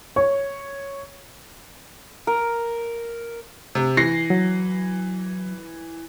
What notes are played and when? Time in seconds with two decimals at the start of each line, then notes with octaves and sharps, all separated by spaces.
0.16 C#5
2.27 A#4
3.75 C3
3.97 E3 A#6 C7
4.30 F#3